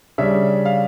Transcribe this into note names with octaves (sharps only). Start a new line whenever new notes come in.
C#3 G3 D4 E5
F5